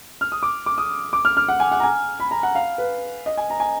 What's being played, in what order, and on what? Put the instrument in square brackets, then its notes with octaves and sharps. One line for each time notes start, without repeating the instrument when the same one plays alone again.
[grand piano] F6
D#6
D6
D6
D#6
D6
F6
F6
F#5
G#5
F#5
A#5
G#5
B5
A#5
F#5
F5
B4
D#5
G#5
A#5
G#5